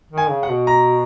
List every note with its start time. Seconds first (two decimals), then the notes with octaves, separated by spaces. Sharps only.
0.12 D#3
0.18 G#5
0.30 C#3
0.43 F#5
0.49 B2
0.67 A#5